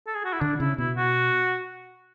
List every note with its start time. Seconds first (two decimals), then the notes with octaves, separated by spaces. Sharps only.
0.07 A4
0.15 G#4
0.24 F#4
0.33 E4
0.41 D3 D4
0.60 C#3 E4
0.78 B2 E4
0.96 F#4